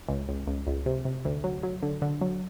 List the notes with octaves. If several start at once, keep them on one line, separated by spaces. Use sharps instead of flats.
C#2
C#2
C#2
C#2
C3
C3
D2
F#3
F#3
D3
D3
F#3